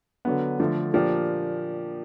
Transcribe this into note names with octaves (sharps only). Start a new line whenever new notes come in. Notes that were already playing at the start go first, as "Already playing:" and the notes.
D3 F#3 B3
D3 F3 A3
A#2 F3 A#3 D4 G4